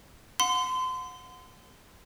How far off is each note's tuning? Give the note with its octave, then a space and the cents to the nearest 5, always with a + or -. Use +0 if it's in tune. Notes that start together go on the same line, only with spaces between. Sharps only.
F#5 -35 C6 -30